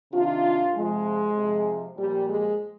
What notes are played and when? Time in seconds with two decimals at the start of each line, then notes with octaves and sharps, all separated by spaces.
0.13 C3 D#3 D4 F4
0.75 C3 F3 G#3
1.36 C3 F3
1.97 A#2 F3 G3
2.28 G#3